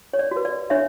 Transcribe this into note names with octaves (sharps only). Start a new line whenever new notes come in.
C#5
D5
F#4
B4
D5
D4 C#5 E5